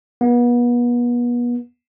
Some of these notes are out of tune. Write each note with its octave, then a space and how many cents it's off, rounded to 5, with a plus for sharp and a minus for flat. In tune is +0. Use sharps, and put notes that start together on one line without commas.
B3 -35